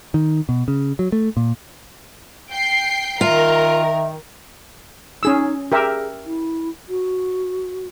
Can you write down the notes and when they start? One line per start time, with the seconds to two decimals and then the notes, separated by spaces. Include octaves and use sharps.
0.14 D#3
0.49 B2
0.68 C#3
0.99 F#3
1.12 A3
1.37 A#2
2.50 G5 C7
3.21 D#3 F4 A#4 E5
5.23 C#4 D#4 G#4 E6
5.72 G4 G#4 A#4 E5
6.26 E4
6.89 F#4